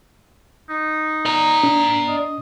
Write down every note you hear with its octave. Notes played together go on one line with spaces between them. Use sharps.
D#4
D5 A#5
D4
D#5